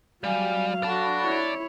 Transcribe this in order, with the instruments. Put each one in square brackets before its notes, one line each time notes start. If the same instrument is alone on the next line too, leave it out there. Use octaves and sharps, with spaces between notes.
[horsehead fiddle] F#3 F5 [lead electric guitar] G3 [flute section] G#5
[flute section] F#4 A4 B5 [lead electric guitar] D5 A5
[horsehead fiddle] E4 C#5